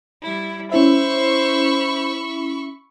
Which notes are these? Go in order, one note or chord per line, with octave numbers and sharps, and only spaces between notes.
G3 E4
C#4 E4 C5 E5 B5 C#6 E6